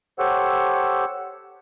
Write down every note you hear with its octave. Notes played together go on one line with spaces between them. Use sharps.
G4 A4 C5 C#5 F#5 E6